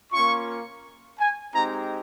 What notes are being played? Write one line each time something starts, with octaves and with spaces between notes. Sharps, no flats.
A#3 C#4 F4 C#6
G#5
G#3 C4 D#4 G4 A#5